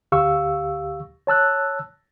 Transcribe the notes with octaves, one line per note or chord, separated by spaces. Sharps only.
D2 G4 F5 C#6 E6
C#5 A5 E6 F#6